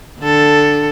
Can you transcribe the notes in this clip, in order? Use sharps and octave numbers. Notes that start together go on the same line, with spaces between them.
D3 A4